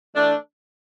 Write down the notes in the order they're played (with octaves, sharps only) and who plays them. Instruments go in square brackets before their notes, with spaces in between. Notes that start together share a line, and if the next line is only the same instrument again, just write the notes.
[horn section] E3 A3 D4